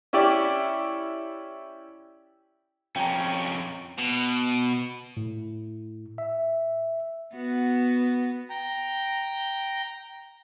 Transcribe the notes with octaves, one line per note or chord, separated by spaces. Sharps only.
C#4 E4 G4 D5
F2 C#4 G5 A#5
B2
A2
E5
B3 F#4
G5 A#5